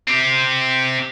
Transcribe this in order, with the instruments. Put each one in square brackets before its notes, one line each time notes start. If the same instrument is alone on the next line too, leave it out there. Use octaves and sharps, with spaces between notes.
[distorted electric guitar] C4 G4